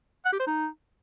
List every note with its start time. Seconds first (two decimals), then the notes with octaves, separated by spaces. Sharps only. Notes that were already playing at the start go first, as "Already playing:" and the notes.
0.25 F#5
0.32 G4
0.40 C5
0.47 D#4